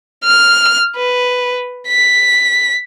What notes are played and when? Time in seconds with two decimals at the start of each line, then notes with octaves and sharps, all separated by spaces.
0.24 F6
0.96 B4
1.88 B6